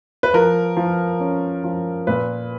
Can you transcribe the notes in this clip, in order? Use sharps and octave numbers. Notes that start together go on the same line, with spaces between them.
B4
F3 A#4
F3
C#4
F3
A#2 B4